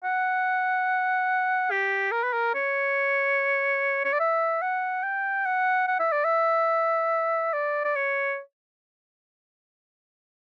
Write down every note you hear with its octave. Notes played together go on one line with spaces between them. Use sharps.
F#5
G4
A#4
B4
A#4
C#5
C#5
D5
E5
F#5
G5
F#5
F#5
E5
D5
E5
D5
D5
C#5